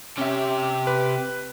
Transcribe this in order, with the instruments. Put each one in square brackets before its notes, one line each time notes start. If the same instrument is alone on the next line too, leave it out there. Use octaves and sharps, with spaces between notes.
[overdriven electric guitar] C3 G4 [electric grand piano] C#4 E5
[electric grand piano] B4